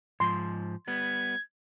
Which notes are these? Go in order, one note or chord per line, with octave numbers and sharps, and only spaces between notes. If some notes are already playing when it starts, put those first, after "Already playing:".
G#2 F3 C6
G3 B3 G#6